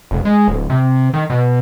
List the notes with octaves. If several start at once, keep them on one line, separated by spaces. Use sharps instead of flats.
F1
G#3
D1
C3
D#3
B2